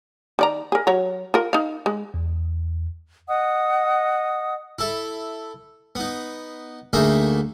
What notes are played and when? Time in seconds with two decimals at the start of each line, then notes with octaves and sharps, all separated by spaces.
0.39 D#3 D5 A#5
0.72 G#4 A#4
0.87 F#3 C#5 A#5
1.34 F4 A#4
1.53 D#4 F5
1.86 G#3
2.14 E2
3.28 D#5 F#5 D#6
4.79 E4 A4
5.95 B3 D#4
6.93 D2 A3 A#3 D#4 G#4 E5